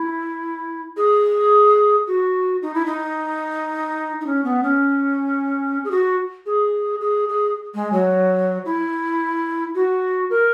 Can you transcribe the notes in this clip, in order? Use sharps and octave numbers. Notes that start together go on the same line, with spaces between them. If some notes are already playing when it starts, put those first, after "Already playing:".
Already playing: E4
G#4
F#4
D#4
E4
D#4
D#4
C#4
B3
C#4
G#4
F#4
G#4
G#4
G#4
G#3
F#3
E4
F#4
A#4